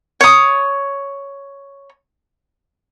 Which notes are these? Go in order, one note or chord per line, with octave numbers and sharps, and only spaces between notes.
C#5 D#6